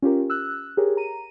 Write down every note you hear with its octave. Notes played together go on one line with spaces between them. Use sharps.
C#4 F4 G4 A#4
E6 F#6
G4 G#4 A#4 C#5
A#5 D#7